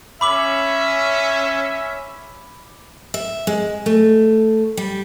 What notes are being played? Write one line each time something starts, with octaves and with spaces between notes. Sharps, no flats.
C#4 E5 B5 D6 F#7
E5
G#3
A3
G3